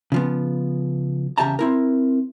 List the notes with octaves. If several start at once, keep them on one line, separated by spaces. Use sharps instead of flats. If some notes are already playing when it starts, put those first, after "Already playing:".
C#3 F3 B3
E2 C#3 G4 E5 A5 A#5
C4 E4 A#4